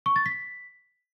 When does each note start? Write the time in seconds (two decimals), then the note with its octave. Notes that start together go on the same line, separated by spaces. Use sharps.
0.06 C#6
0.16 A6
0.26 B6